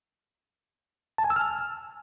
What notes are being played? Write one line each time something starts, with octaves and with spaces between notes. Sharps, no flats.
A5
G#5
E6
F6